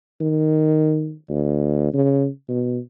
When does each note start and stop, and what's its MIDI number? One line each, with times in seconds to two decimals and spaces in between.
0.21 1.14 51
1.29 1.91 38
1.94 2.27 49
2.49 2.79 47